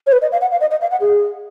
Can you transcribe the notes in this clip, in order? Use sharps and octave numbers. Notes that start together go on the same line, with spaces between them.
C#5
B4
D#5
F5
F#5
F5
D#5
D#5
F5
F#5
G#4